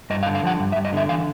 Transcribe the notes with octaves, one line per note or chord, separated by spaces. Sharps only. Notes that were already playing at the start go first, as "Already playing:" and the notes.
G2 D#5
F5
D3
F5
F3 F#5
G2
E5
G2
D#5
D3 E5
E3 F5